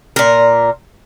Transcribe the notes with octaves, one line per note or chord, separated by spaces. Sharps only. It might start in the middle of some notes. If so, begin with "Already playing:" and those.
A#2 A#4